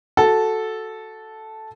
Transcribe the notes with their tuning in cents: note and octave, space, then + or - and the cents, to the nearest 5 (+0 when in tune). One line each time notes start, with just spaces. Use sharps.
F#4 +0 A4 -5